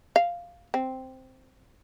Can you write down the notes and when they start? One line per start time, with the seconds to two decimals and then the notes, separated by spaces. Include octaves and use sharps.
0.16 F5
0.74 C4